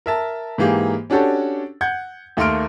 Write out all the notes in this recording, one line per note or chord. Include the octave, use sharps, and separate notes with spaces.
A#4 E5 A5
G#2 E3 A#3 G4 G#4
C#4 D4 F#4 G4 A4 C#5
F#5 G6 G#6
D#2 A3 A#3 C6 F6 D7